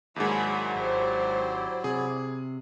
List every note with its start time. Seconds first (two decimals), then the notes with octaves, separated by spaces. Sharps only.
0.16 D#2 G#2 F#3 E4 G#4 A#4 D5 B5
0.75 G#1 G4 C5
1.84 C3 G#4